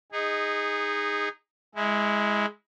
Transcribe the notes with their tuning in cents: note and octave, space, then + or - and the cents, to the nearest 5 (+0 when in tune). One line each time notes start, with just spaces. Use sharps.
D#4 +0 G#4 -20
G#3 +0 E4 -20